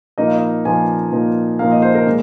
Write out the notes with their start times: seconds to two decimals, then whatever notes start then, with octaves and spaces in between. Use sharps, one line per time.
0.18 A#2 F3 A#3 D#4 D#5
0.28 F5
0.37 D#5
0.65 A#2 F3 A#3 D#4 G#5
1.12 A#2 F3 A#3 D#4
1.59 A#2 F3 A#3 D#4 F5
1.72 D#5
1.82 C5
1.95 A#4
2.07 A#2 G#3